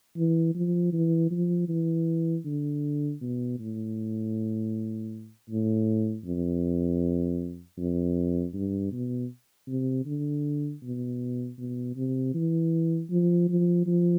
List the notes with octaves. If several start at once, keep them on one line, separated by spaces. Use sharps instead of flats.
E3
F3
E3
F3
E3
D3
B2
A2
A2
F2
F2
G2
B2
C3
D3
B2
B2
C3
E3
F3
F3
F3